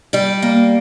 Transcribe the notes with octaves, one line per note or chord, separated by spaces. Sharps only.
G3 D5
A#3